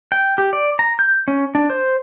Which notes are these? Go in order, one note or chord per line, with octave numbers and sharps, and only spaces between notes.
G5
G4
D5
A#5
G6
C#4
D4
C5